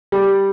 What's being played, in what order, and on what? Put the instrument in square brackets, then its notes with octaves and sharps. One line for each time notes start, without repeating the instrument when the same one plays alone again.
[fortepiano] G3